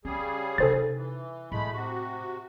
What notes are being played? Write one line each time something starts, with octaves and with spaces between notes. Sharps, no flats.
C#3 G3 C#4 G#4
C3 D#4 A4 C5 A6
E3
A2 G#3 A3 B5
C3 F#4